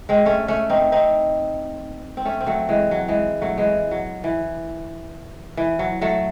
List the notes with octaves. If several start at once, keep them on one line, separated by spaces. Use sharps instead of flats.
G#3 C4
A3 C#4
A3 C#4
C4 D#4
C4 D#4
C4
A3 C#4
C4
F#3 A3
E3 G#3
F#3
E3 G#3
F#3 A3
E3 G#3
F#3
E3
E3
F#3
F#3 A3